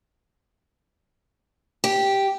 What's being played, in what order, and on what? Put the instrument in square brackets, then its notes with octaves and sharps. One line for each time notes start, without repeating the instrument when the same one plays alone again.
[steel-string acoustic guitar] G4